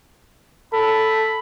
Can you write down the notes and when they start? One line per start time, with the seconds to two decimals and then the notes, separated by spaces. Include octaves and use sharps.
0.73 A4 B5